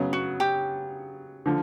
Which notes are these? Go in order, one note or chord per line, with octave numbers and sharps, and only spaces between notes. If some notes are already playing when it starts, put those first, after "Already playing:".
Already playing: C#3 F#3 B3
F#4
G4
D3 F3